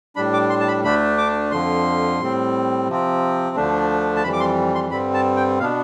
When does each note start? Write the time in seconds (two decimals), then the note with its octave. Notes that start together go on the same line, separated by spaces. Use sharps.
0.16 A2 G3 D4 B5
0.33 D6
0.50 C6
0.60 A5
0.68 B5
0.84 D2 D3 A3 D4 B5
1.18 D6
1.51 F2 D3 F3 C6
2.20 A2 G3 C4
2.88 C3 F3 C4
3.56 D2 D3 F3 A3 D4
4.16 A5
4.24 F2 E3 G3 B5
4.33 D6
4.40 C6
4.75 C6
4.91 G2 D3 G3 C4 B5
5.14 A5
5.36 G5
5.59 B2 B3 D4 F5